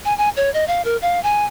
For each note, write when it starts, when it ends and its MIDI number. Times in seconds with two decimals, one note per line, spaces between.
0.05 0.16 80
0.18 0.29 80
0.37 0.52 73
0.54 0.65 75
0.68 0.82 77
0.85 0.97 70
1.02 1.22 77
1.23 1.45 80